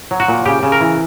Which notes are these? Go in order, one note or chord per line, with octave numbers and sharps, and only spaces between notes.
F#3
F#4
A#2
C#3 G4
C#3
A#4
E3